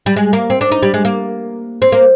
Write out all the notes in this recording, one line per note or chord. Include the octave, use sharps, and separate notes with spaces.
G3
G#3
A#3
C4
D4
D#4
G3
G#3
A#3
C4
A#3